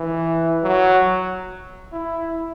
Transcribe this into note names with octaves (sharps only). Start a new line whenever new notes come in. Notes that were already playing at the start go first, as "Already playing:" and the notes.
Already playing: E3
F#3
E4